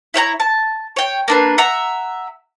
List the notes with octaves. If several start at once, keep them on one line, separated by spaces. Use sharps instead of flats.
E4 C#5 G5 A#5
A5
C#5 G5
A#3 D4 B4
E5 F#5 A#5